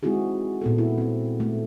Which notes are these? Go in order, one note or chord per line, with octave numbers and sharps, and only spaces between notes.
G#3 C4 D#4 E4 F#4 G#4
A#2 B3 A4
E4
C4 E4
A3